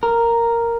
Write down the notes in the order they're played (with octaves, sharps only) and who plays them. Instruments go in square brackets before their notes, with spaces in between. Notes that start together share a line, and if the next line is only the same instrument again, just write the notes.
[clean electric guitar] A#4